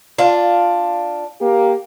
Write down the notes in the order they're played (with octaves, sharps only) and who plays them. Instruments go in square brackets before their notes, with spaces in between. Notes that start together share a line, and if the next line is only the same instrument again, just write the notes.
[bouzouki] D4 F4
[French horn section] A#3 G4